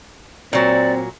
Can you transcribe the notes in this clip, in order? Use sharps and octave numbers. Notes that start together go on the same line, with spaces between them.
A#2 F#3 C4 D5